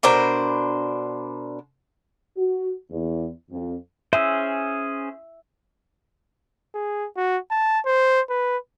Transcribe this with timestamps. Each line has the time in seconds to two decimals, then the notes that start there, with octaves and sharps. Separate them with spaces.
0.03 B2 D4 A#4 C5
2.38 F#4
2.91 E2
3.51 F2
4.13 C#4 G#4 C5 E5
6.75 G#4
7.17 F#4
7.51 A5
7.86 C5
8.30 B4